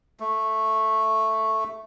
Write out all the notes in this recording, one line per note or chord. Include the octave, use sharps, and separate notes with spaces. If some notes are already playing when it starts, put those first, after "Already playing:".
A3